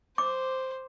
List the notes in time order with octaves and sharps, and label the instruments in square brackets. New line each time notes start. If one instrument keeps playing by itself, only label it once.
[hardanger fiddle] C5 [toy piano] D6